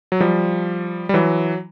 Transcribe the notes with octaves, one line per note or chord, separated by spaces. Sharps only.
F#3
F3 G3
G3
E3 F#3